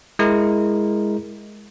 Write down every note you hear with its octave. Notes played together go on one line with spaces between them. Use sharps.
G#3 E4 A#4